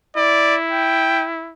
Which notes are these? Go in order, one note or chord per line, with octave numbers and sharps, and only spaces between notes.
E4 D5
G5